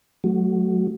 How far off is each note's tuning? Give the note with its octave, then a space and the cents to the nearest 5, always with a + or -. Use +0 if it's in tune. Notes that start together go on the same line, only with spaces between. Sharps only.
F#3 +0 A3 -20 F#4 +5